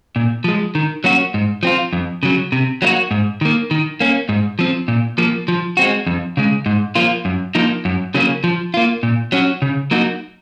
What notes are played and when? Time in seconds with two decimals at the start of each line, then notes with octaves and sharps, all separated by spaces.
0.16 A#2
0.44 F3 G#3
0.75 D#3
1.04 F#3 A#3 C#4 F#4
1.34 G#2
1.63 F3 C4 F4
1.93 F2
2.23 C#3 F#3
2.52 C3
2.82 F#3 A#3 D#4 F#4
3.11 G#2
3.41 D#3 A#3
3.71 D#3
4.00 A#3 C#4
4.29 G#2
4.59 F3 C4
4.88 A#2
5.18 F3 A#3
5.48 F3
5.77 G#3 C4 F#4
6.07 F2
6.37 C#3 G#3
6.66 G#2
6.95 F3 A#3 F4
7.25 F#2
7.55 F3 A#3 D#4
7.85 F#2
8.14 C#3 F#3 A#3 C#4
8.44 F3
8.74 A#3 F4
9.03 A#2
9.32 F#3 C#4 F#4
9.62 C#3
9.91 F#3 A#3 D#4 F#4